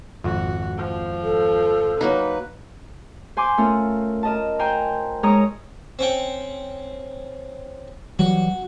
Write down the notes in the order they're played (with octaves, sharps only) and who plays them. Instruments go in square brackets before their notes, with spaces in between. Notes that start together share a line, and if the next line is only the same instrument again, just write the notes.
[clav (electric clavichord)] G#1 F2 [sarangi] F#4
[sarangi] F3
[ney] A4
[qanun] F#3 A#3 D#4 [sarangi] B4
[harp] C5 G#5 C6 D6
A3 C#4 F4 A#4
A#4 D#5 A5
C5 G5 G#5 A#5
G#2 G#3 C#5 A#5 D#6
[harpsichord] C4 C#4 G5
[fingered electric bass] E3 F#3 G3 [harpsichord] F#4